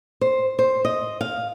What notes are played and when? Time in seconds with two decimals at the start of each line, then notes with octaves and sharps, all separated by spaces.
0.21 C5
0.59 C5
0.85 D#5
1.21 F5